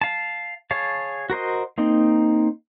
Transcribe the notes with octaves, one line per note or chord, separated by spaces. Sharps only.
F5 A5
G#4 C#5 F5 A5
F#4 A#4 C5 D#5
A#3 C4 D#4